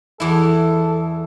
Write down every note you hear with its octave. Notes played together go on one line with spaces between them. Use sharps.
E2 E4 A4